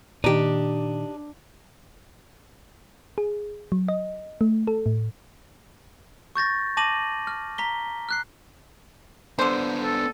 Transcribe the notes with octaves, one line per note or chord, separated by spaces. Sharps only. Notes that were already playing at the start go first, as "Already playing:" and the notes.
A#2 D#3 D4 D#4 G4
G#4
F#3
D#5
A3
A4
A2
C#6 G6 A6 A#6
A5 D6 A#6 D#7 F#7
F6
A#5 B6 G7
F6 F#6 C7
D3 B3 D4 C5
A4